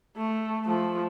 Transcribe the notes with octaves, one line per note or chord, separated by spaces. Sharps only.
A3
F3 A3